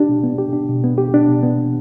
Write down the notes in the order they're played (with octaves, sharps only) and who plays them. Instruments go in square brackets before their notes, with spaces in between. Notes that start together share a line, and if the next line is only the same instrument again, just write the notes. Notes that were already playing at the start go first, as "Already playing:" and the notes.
Already playing: [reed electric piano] D4 G4
B2
B3
G4
D4
B2
B3
G4
D4
B2
B3